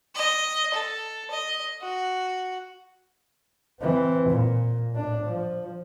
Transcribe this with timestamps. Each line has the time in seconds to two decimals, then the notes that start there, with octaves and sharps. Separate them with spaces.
0.15 D#5
0.74 A4
1.31 D#5
1.81 F#4
3.81 E3 C4
4.30 A#2
4.92 A2 D4
5.25 F3